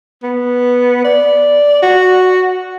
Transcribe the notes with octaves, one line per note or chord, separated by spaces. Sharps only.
B3
D5
F#4